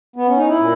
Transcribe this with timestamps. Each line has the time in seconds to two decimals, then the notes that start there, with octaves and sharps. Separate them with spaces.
0.16 B3
0.27 C#4
0.37 D#4
0.48 E4
0.58 A#2